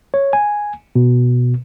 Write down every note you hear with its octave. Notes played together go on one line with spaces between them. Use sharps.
C#5
G#5
B2